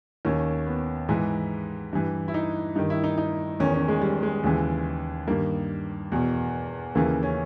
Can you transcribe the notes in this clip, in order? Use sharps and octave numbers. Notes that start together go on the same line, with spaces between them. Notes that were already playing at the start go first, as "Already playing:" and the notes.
D#2 D#3 C#4
B3
G#2 E3
G2 E3
E4
D#4
G2 D#3 D#4
E4
D#4
D#4
E2 D#3 C#4
C#4
G#3
G3
G#3
D#2 C#3 E3
G2 D#3 A#3
E2 B2
D#2 C#3 E3 A#3
C#4